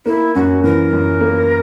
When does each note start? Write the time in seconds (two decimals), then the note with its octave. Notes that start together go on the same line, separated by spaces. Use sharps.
0.06 A#3 E4
0.35 F#2 F#4
0.63 E3 A#4
0.93 F#2
1.21 A#3